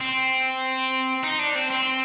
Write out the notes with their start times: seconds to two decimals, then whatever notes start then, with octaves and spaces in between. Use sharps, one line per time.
0.01 C4
1.23 D#4
1.39 D4
1.55 C4
1.70 C4